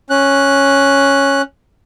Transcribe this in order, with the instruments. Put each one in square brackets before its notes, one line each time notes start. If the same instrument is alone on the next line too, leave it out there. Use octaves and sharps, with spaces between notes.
[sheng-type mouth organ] C#4 F#6